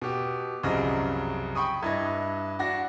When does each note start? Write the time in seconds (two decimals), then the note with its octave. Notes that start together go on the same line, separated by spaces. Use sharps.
0.02 B2 G4
0.63 C2 F#2 C#3 F3 D#5
1.55 G5 B5 C#6 D#6
1.83 G2 E4 D#5 G#6
2.59 D4 F#4 A#6